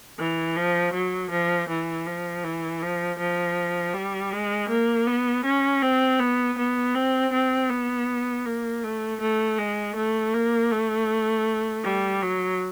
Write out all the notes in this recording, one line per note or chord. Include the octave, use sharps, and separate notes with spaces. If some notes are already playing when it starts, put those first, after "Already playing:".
E3
F3
F#3
F3
E3
F3
E3
F3
F3
G3
G#3
A#3
B3
C#4
C4
B3
B3
C4
C4
B3
A#3
A3
A3
G#3
A3
A#3
A3
G3
F#3